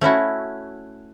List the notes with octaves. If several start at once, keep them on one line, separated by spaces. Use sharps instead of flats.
A3 C#4 E4 F#4